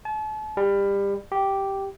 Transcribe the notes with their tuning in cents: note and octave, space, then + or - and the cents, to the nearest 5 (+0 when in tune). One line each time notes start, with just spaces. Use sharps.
A5 -40
G3 +25
G4 -5